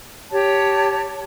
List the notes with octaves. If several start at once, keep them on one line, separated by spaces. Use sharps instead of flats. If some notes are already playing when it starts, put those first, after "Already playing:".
G4 C#5 A5